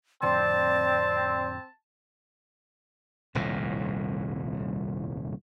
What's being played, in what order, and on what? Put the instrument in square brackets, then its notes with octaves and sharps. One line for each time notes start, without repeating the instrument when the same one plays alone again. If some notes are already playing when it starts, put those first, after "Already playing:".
[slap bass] F2 A2 D3 [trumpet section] C4 [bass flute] D5 [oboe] A5
[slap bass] D#1 C2 F2 A2